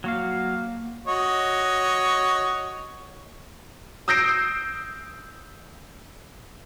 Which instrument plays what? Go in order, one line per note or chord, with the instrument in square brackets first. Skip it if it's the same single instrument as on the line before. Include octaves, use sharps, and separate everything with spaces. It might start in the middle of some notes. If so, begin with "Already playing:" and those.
[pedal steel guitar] F#3 F#4 F5 [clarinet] A#3
[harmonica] F#4 C#5 D#5
[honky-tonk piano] D#6 E6 G6 A#6 C7 D7